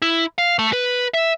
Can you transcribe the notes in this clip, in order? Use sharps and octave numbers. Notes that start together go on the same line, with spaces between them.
E4
F5
A3
B4
E5